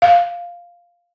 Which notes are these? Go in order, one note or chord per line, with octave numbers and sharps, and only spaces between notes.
F5